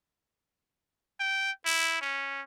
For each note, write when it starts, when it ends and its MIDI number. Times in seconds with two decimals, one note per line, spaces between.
1.20 1.52 79
1.66 1.99 64
2.01 2.42 61